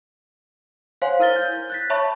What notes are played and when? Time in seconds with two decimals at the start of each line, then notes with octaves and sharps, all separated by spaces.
1.02 C5 C#5 F5 F#5 G#5 C6
1.19 E4 A#4 F6 A6 G7
1.36 G6
1.70 F#6 A6 B6
1.90 C#5 E5 A5 B5 C#6